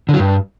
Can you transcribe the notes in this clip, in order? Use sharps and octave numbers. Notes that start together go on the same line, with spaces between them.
D3
F#3
G2